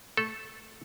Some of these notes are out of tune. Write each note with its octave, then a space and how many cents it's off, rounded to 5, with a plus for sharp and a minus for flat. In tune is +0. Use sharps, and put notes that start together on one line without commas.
A3 +0 A4 -10